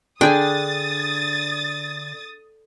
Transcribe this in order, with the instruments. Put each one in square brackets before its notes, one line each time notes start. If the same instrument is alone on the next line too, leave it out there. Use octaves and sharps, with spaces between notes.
[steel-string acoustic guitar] D3 [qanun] D4 G#4 G#5 [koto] G5 [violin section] D#6 A6